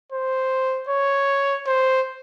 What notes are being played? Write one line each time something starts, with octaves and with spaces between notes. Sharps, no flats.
C5
C#5
C5